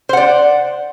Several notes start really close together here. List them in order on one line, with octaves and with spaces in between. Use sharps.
C5 F#5 D5